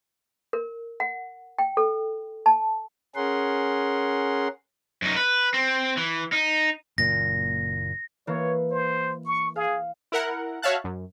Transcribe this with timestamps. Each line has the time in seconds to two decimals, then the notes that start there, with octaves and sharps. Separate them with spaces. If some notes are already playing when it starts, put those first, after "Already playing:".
0.53 A#4
1.00 F#5
1.59 G5
1.77 A4
2.46 A5
3.15 C#4 G#4 A#4 F#5 C6
5.02 F#2 D#4
5.16 B4
5.54 C4
5.97 E3
6.32 D#4
6.98 F#1 A#2 A#6
8.27 E3 A#3 C#5
8.72 C5
9.26 C#6
9.56 G#4 F5
10.12 E4 A#4 F#5
10.62 F#4 C#5 E5 F5 A5 F#6
10.84 F#2